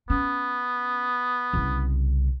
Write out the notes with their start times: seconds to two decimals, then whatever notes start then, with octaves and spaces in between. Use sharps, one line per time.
0.10 B3 C#4
1.53 C2 C#3